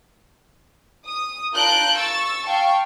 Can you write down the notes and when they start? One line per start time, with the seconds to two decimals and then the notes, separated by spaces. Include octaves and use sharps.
1.06 D#6
1.53 F4 A#4 A5 F#6 G6 D7
1.96 C#6 E6 A6
2.45 F5 G5 A5 C#6